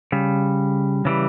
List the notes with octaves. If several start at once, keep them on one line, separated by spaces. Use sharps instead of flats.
C#3 G3
C#3 E3 G3